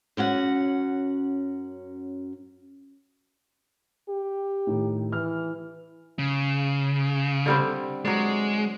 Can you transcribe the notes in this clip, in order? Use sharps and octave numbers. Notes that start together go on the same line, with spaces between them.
F#2 C#4 F#4 F#5
G4
A2 D#3
E3 F6
C#3
D3 G3 C4
F#3 G#3 D5